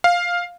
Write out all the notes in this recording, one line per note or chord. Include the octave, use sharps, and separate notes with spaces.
F5